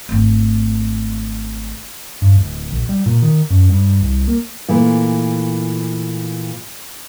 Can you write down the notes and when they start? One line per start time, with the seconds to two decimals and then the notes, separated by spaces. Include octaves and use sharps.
0.09 G#1 A3
2.22 G2
2.36 D1
2.72 A#1
2.89 G3
3.06 A#2
3.22 D#3
3.50 F#2
3.69 G2
4.02 C2
4.28 A#3
4.69 A#2 E3 A3